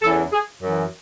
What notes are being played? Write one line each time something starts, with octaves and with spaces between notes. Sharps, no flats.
E2 C#3 E3 A4
G#4
F#2 E3